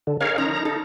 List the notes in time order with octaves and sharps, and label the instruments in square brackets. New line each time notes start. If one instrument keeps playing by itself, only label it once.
[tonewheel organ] D3
[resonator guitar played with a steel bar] D#4 G#4 [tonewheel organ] A#4 C#5 F5
[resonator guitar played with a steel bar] F3 C#4 [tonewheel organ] D#4 A#5
[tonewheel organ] D#4 [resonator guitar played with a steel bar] A4